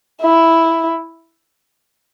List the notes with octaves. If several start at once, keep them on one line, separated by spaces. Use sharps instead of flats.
E4